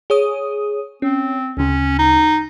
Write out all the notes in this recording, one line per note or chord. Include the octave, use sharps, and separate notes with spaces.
G#4 C#5 D#6
C4 C#4
D2 C#3 C#4
D#4